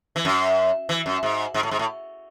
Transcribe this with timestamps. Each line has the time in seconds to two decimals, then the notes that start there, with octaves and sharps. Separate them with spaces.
0.16 E3
0.25 F#2
0.89 E3
1.06 F#2
1.23 G#2
1.54 G#2
1.63 A2
1.71 G#2
1.79 A2